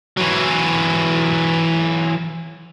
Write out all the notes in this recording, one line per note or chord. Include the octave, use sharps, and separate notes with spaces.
E3 F#3